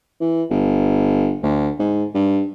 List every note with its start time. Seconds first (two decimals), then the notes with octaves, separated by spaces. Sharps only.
0.21 E3
0.50 G1
1.43 D2
1.80 G#2
2.15 G2